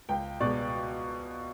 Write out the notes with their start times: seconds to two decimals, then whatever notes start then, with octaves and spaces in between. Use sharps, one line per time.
0.09 C#2 G5
0.40 B2 G#3 D5